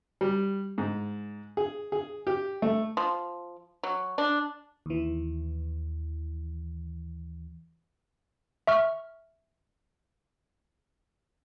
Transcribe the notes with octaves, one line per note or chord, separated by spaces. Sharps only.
G3
G#2
G#4
G#4
G4
A3
F3
F#3
D4
D#2 E3
E5 C#6 F6